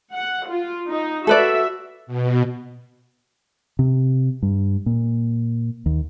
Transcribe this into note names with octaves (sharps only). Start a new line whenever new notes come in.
F#5
F4
D#4
F#4 A4 B4 D5 E5
B2
C3
G2
A#2
D#2